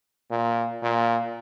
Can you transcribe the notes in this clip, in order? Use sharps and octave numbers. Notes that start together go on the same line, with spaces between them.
A#2
A#2